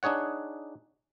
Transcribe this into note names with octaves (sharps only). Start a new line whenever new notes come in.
D4 D#4 G#4 C#5 F#5